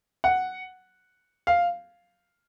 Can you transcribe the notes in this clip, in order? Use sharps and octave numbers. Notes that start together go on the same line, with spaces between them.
F#5
F5